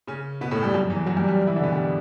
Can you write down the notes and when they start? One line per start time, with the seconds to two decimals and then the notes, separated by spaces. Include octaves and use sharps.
0.07 C#3 C#4
0.41 B2 B3
0.51 A2 A3
0.63 G2 G3
0.74 F#2 F#3
0.90 E2 E3
1.06 F#2 F#3
1.17 G2 G3
1.28 G2 G3
1.47 E3 E4
1.56 D3 D4
1.64 B2 B3
1.72 G2 G3